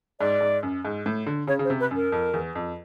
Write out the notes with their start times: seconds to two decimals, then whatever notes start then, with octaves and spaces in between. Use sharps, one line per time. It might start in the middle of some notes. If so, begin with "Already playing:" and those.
0.20 G#2 D5
0.41 G#2
0.63 F#2
0.85 G#2
1.06 A2
1.27 D3
1.47 C#3 C#5
1.59 C#3
1.64 C5
1.70 C3
1.80 B4
1.91 F#2
1.96 A#4
2.12 F2
2.34 E2
2.55 F2